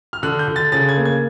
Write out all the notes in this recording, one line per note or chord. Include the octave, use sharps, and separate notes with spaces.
F6
D3 F#6
G6
D3
A6
C#3 A6
G#6
A#3
G#6